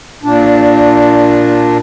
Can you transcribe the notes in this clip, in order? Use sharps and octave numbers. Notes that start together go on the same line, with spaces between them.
A#2 D4